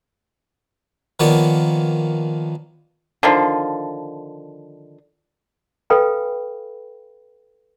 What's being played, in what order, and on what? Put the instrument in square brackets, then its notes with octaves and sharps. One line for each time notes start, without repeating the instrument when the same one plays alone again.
[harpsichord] D#3 F3 A#3 B3 C#5 D5
[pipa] D3 D#3 F3
[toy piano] A4 B4 F5 G5 G#5 B5